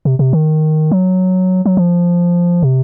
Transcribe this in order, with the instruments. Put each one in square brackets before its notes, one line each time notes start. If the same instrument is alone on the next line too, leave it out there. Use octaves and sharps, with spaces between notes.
[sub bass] C3
C3
D#3
F#3
F#3
F3
C3